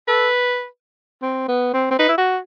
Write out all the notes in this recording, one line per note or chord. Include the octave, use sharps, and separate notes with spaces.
A4 B4
C4
B3
C4
C4
D#4 B4
E4
F#4